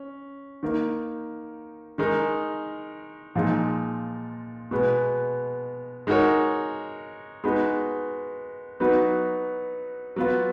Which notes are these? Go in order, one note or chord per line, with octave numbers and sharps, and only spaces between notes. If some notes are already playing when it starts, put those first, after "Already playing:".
Already playing: C#4
D#3 A#3 D#4
D#3 G#3 D#4 A#4
A#2 F3 G#3 D#4
B2 G#3 B3
G#3 D#4 F#4 A#4 C#5
G#3 B3 D#4 F#4 B4
F#3 B3 D#4 F#4 B4
F#3 B3 F4 B4